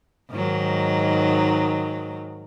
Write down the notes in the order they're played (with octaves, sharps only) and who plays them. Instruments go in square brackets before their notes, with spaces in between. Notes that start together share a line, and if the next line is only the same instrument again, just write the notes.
[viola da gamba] G#2 D#3 F#3